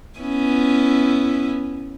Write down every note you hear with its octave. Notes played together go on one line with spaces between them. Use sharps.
B3 C#4 E4